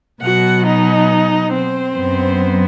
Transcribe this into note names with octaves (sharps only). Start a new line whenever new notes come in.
B2 F#3 B3 F#4 F#5
D#4 D#5
C4 C5
F#2 F#3 B3